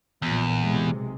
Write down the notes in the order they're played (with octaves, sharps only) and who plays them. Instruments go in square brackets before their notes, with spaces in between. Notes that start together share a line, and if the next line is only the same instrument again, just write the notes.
[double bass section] A#1 A#2 [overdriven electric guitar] E2
[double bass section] B1 C3 G#3